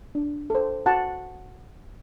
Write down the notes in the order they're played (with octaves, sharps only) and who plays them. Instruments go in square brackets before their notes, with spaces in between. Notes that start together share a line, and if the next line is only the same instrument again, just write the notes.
[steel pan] D4
A4 C5
F#4 F#5 A5